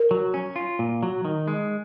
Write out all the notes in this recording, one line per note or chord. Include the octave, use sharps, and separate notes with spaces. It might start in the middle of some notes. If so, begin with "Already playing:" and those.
Already playing: A#4
F#3
C#4
F4
A#2
F#3
D#3
G#3